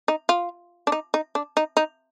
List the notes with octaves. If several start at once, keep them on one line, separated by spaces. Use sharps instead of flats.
D#4
F4
D4
D#4
D#4
D4
D#4
D#4